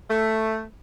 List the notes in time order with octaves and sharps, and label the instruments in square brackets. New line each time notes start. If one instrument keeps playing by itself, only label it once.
[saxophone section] A3